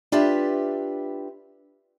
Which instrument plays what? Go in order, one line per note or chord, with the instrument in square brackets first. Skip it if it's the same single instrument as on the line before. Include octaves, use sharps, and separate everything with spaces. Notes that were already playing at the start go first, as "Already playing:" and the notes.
[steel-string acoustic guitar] D4 F4 G4 B4 E5